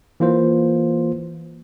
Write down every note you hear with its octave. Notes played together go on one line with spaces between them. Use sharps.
E3 A#3 F4 C5